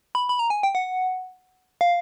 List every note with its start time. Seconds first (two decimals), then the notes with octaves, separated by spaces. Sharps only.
0.15 B5
0.29 B5
0.39 A#5
0.50 G#5
0.63 G5
0.75 F#5
1.81 F5